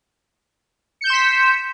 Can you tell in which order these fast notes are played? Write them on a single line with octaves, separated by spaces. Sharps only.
C#7 G6 E7 C6 B6